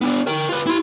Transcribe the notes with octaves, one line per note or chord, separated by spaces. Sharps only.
B3 D4
A#4 G5
F4 B4
E4 C6